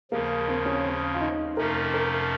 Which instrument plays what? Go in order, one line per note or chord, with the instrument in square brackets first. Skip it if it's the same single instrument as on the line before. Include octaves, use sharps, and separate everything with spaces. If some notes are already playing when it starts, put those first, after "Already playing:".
[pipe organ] D#2 C#3 F3 [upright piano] A#3
[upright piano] C4
C#4
C4
F4
D#4
[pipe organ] F2 C3 F3 A3 C#4 [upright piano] A#4
[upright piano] A#4